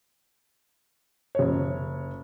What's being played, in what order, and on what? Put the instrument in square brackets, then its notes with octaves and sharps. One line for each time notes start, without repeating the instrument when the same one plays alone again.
[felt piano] F#1 C#5